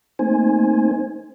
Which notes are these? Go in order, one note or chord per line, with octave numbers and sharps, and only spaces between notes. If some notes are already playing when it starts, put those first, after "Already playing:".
A3 A#3 C4 D#4 C5 G#5